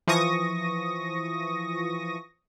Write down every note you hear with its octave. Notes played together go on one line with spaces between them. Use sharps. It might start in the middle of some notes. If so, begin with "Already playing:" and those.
E3 F3 C#6 D#6 A#6